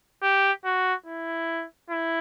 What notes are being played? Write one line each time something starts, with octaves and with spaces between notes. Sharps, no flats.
G4
F#4
E4
E4